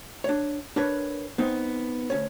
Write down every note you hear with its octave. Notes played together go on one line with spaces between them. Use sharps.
D4 C#5
D4 A#4 B4 C#5
B3 C4 D#4
D2 C#4 C#5